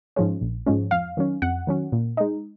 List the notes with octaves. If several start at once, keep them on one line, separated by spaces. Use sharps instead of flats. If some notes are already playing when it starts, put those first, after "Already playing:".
G#2 F3 G#3 C#4
A#1
G#2 F3 G#3 C#4
F2 F5
D#3 F#3 C#4
F2 F#5
D#3 F#3 C#4
A#2
G#3 D#4